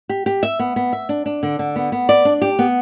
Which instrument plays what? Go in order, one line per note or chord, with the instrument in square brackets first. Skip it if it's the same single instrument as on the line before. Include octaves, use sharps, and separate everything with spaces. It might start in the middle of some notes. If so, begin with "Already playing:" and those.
[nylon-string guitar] G4
G4
E5
B3
B3
E5
D4
D4
D3
D3
B3
B3
D5
D4
G4
B3